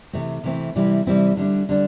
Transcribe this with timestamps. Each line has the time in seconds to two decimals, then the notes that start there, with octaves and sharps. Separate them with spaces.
0.13 C3 E3 A3 C4
0.43 C3 E3 A3 C4
0.76 C3 E3 G3 C4 E4
1.07 C3 E3 G3 C4 E4
1.37 D3 G3 D4
1.69 D3 G3 D4